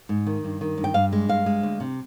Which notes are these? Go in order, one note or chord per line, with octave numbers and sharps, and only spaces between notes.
G#2
D#3
G2
D#3
G2
G5
G2 F5
G#3
G2 F5
G#3
D2
C3